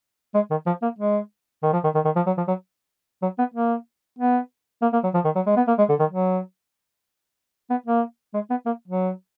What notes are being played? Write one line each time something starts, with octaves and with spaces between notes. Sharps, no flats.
G#3
D#3
F3
A#3
G#3
D#3
F3
D#3
D#3
D#3
F3
F#3
F3
F#3
F#3
B3
A#3
B3
A#3
A#3
F#3
F3
D#3
F#3
G#3
B3
A#3
G#3
D3
D#3
F#3
B3
A#3
G#3
B3
A#3
F#3